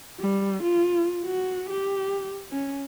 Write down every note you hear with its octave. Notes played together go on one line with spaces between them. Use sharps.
G3
F4
F#4
G4
C#4